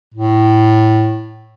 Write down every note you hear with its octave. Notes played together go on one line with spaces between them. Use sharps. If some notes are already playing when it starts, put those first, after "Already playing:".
A2